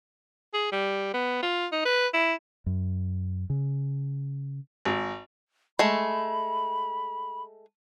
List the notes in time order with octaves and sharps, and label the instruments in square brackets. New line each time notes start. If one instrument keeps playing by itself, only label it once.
[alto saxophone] G#4
G3
B3
F4
D#4
B4
E4
[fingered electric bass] F#2
C#3
[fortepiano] G#1
[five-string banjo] G#3 A3 [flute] B5